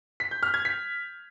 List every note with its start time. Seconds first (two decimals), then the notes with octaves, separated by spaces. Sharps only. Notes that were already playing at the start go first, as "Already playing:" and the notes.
0.20 B6
0.31 G6
0.43 F6
0.54 G#6
0.65 B6